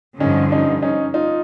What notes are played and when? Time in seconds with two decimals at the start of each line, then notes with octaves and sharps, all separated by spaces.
0.20 G2 D3 F3 C#4 D#4
0.52 C#4 D#4
0.82 C#4 D#4
1.14 D#4 F4